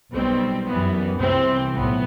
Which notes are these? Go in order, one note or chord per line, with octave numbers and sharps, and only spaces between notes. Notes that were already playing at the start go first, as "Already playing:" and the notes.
B1 B2 G3 C4
F#2 E3 G3 B3
C2 C3 E3 C4
B1 A2 B3